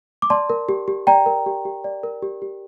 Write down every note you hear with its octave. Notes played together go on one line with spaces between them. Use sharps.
D6
D5 A5 C6
A#4
G4
G4
D5 G5 A#5
A#4
G4
G4
D5
A#4
G4
G4